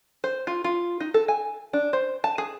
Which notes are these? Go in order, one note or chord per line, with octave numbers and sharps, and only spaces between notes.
C5
F4
F4
D#4
A4
G#5
D4
C5
A5
G#4